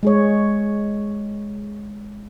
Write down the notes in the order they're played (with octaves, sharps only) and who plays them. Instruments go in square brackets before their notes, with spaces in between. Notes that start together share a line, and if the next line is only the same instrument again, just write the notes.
[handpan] G#3 G#4 C#5